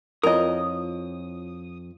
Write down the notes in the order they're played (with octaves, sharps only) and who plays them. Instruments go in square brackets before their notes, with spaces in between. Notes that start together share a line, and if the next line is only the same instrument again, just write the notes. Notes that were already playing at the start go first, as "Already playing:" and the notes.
[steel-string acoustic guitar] F2 [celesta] E4 F4 C#5 [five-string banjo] A#4 D#5 [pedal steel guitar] D#6